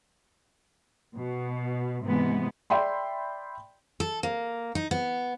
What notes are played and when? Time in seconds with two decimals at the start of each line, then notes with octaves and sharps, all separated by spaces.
1.17 B2
2.03 G#2 C3 E3 G#3 B3
2.70 D5 E5 G5 B5 C6
4.00 A4
4.23 A#3
4.75 D#4
4.91 B3